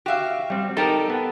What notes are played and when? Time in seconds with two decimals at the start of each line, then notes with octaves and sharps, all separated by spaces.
0.06 F#4 G4 E5 F5
0.50 G3 C4
0.77 D#4 G4 A4 A#4
1.10 B3